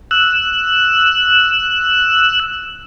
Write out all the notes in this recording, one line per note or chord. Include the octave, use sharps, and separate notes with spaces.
E6 F#6